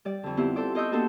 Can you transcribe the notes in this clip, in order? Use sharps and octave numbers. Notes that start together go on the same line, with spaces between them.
G3 D5
F2 D3
B3 C4 E4 F4 G4
A4 C5 D5 D6
G4 C5 D#5 C#6 E6 G6
A#3 B3 D4 F#4 A4 C5